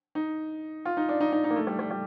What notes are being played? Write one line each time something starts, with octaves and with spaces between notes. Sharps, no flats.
D#4
F4
D#4
D4
D#4
D#4
D#4
A#3
A3
G3
G3
G3